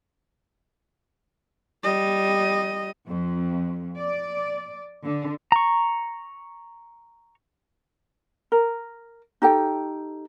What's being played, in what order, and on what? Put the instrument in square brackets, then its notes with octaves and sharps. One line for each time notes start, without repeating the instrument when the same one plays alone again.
[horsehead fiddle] G3 D#5
[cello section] F2
D5
D3
[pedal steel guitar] A#5 C#6
[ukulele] A#4
D#4 G4 A4 G5